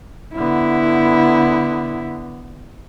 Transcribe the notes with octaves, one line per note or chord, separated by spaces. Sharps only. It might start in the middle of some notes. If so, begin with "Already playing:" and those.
D3 B3 E4